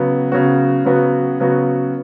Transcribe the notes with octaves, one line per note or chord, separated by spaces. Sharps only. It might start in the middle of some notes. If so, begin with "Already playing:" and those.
Already playing: C#3 F#3 B3 F#4
C#3 F#3 B3 F#4
C#3 F#3 B3 F#4
C#3 F#3 B3 F#4